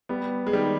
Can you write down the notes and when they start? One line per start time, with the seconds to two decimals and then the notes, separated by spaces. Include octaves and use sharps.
0.09 G3 B3
0.47 G#3
0.53 D#3 G3